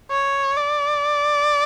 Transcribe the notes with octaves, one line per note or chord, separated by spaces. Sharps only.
C#5
D5